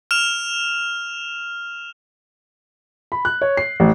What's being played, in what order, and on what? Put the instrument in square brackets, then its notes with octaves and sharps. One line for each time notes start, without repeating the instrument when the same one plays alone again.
[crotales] F6 E7 F7
[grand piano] B5
F#6
C#5
C7
A1